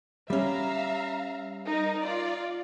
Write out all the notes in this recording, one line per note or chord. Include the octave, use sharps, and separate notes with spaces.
G3 C#4 E5 F5 A#5
D#4 A#4
F4 D5